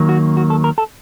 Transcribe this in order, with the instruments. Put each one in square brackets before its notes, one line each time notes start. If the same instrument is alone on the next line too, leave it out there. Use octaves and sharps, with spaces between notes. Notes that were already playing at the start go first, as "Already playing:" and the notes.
Already playing: [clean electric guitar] D#2 D#3 F#3 A#3
F#4
F#4
A4
A#4
A4